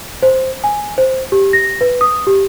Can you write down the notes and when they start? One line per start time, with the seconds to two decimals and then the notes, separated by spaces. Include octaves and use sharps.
0.23 C5
0.64 G#5
0.98 C5
1.32 G4
1.53 A#6
1.81 B4
2.01 D#6
2.27 G4